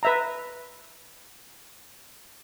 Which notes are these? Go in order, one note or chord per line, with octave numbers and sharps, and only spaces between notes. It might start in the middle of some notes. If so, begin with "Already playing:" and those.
B4 E5 A#5